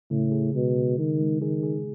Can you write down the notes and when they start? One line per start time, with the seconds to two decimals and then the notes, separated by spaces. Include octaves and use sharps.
0.11 A2 C#3
0.32 G#4
0.54 B2 G#3
0.77 C#3
0.98 D#3 D#4
1.20 G#3
1.41 D#3 G#4
1.63 G#4